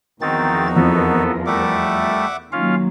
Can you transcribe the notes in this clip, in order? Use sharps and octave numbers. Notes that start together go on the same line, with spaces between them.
E2 D#3 F3 C4 D#4 F#4 A#4 A6
F2 B3 A4
G3 A3 E5 F#5 D6
D#3 F#3 A#3 C#4 F4 F5